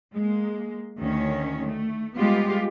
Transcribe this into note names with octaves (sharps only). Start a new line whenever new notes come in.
G#3 A#3
D2 D#3 C#4
A3
G3 G#3 B3 F4 G4